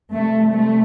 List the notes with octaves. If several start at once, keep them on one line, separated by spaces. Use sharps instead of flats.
C3 G3 A3
A3